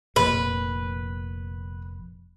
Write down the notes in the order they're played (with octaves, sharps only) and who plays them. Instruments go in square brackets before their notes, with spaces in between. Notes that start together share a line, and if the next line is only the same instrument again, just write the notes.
[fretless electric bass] F1 F2 A#2 [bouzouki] B4